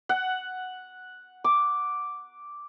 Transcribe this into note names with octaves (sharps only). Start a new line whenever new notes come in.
F#5
D6